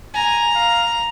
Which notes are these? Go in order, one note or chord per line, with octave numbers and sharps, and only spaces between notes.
G#5 A#5
F5